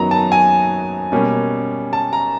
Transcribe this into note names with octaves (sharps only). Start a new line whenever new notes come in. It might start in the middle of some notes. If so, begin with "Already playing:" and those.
Already playing: F#2 D#3 F#3 B3 D#4 A#5
A5
G#5
B2 G3 A#3 C#4
A5
A#5